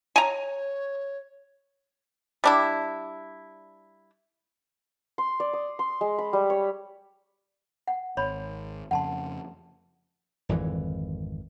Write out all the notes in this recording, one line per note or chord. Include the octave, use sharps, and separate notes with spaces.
C#5 G#5 A#5
G3 D4 E4
C6
D5
D#6
C6
G#3
B5
G3
C#5
F#5
G#1 C#5 B5 C6
F2 C#3 F#5 A5 C6
G#1 F2 D3 E3